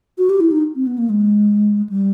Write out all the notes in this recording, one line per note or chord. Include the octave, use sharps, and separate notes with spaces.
F#4
G4
E4
D#4
C4
B3
A#3
G#3
G3